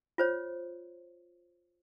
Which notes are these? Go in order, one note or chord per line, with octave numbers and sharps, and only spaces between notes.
F4 C5 C#5